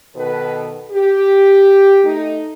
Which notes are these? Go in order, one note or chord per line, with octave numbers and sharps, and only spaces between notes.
B2 D#3 A4 B4
G4
A3 D#4